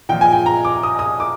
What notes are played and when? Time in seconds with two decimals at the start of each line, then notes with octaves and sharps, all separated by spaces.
0.09 A#2 F3 G5
0.21 G#5
0.32 G5
0.46 A#5
0.65 D6
0.83 D#6
0.99 D#6
1.20 D6